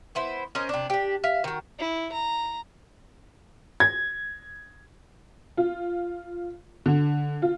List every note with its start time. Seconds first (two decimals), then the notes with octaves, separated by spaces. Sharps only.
0.15 B3 E4 C5
0.55 C#4 A#4 C5 D#5
0.69 C3 D4
0.90 D4 G4
1.24 E5 F5
1.44 D#3 F#4
1.79 E4
2.12 A#5
3.80 G#6
5.57 F4
6.86 D3
7.42 F4